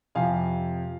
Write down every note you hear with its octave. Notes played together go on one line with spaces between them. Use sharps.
F2 C3 F3 F5 G#5